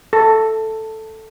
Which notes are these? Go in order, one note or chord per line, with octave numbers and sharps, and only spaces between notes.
A4